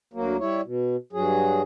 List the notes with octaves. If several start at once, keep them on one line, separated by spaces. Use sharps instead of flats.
D2 F#3 A#3
G3 E4 C#5
B2
G2 F#3 G#4